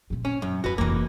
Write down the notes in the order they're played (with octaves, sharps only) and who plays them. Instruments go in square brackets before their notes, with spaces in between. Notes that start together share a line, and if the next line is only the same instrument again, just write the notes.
[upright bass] A#2 D#3
[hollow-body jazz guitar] C#4
F#2
[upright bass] F2 G#2 [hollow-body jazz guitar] F#4 B4
[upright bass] F1 C#3 [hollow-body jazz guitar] E3 A#3